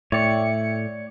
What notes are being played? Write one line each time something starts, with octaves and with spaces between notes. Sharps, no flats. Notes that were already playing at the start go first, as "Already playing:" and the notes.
A2 C#5 D5 E5 G5 C#7